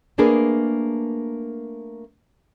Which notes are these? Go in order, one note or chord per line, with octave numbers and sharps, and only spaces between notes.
A3 A#3 D4 G#4 A#4 B4